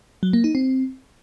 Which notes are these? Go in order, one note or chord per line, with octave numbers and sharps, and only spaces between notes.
F#3
A#3
D#4
C4